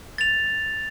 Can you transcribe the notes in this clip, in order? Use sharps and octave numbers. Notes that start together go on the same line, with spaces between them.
A6 F7